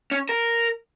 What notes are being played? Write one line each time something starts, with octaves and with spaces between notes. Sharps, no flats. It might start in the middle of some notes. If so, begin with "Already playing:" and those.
C#4
A#4